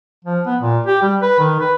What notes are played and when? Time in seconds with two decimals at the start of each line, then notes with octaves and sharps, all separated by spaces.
0.25 F3
0.46 B3
0.59 A#2
0.87 G4
1.02 G3
1.22 B4
1.39 D#3
1.60 B4